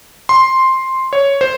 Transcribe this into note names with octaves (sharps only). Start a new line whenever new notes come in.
C6
C#5
C5